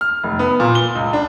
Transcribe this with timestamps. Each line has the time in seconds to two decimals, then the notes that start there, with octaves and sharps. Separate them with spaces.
0.01 F6
0.24 F1
0.39 B3
0.60 A#2
0.75 G7
0.95 C#2
1.13 D4